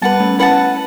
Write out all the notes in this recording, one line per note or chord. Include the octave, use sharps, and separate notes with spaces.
G3 B3 B4 F#5 A5
A3 C#4
C#4 E4 B4 F#5 A5